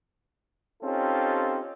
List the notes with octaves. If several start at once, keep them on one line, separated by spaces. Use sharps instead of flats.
C4 C#4 D#4 F4 G4 A4